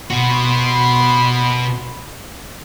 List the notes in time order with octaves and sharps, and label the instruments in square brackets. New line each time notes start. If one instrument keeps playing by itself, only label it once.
[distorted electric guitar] B2 F#4 [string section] B5 C6